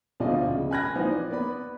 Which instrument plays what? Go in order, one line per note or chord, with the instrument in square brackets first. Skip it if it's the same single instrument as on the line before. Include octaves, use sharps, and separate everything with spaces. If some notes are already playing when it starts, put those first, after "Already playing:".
[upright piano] D2 B2 F3 F4 D5 D#5
C#3
G#5 B5 F#6 G#6 A#6
E3 F3 C4 D#4
D5
B3 B4 D5 B5